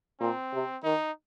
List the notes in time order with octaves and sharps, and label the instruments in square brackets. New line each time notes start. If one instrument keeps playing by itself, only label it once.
[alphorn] A#2 [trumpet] C4
[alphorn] C3
[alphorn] D#3 [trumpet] D#4